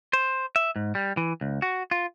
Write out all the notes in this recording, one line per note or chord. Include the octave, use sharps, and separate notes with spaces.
C5
E5
G#2
G3
E3
C#2
F#4
F4